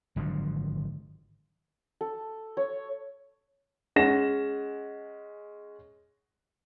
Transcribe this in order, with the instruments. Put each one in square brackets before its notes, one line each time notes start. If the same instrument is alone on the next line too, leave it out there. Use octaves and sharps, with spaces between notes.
[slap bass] G#1 D3 F3 F#3
[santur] A4
C#5
[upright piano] G#3 C#4 F#5 A#6 E7